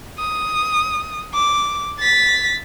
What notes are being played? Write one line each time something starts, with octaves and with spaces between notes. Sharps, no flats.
D#6
D6
A6 B6